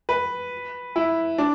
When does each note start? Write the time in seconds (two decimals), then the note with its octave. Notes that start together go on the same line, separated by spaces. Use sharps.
0.09 B4
0.96 E4
1.38 D4